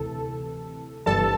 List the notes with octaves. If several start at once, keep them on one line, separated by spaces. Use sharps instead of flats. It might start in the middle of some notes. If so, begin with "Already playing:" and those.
Already playing: D2 C3 E3 A4
G1 G2 E3 G3 A4 A5